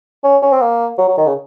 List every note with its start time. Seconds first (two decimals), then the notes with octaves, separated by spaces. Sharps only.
0.24 C#4
0.42 C#4
0.53 C4
0.61 A#3
0.98 F#3
1.08 F#3
1.18 D#3
1.27 C#3